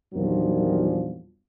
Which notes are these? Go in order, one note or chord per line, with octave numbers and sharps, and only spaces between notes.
E2 G2 A#2 D#3 F3 F#3